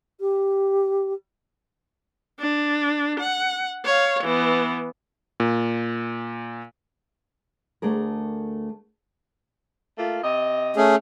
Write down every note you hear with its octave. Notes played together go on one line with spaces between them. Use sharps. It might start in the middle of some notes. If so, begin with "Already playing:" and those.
G4
D4
F#5
C#5 F5
E3 B3
A#2
D2 A3 D4 G#4 A#4
A3 A#3 F4
C3 D#5
A3 C#4 G#4